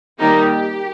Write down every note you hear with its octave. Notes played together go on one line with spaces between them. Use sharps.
D#3 G3 A#3 D#4 G4